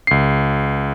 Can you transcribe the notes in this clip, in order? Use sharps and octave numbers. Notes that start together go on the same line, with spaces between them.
C#2 C7